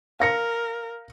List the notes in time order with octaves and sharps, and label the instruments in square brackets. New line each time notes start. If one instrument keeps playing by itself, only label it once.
[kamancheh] A#4 [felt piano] F5 A#6 C#7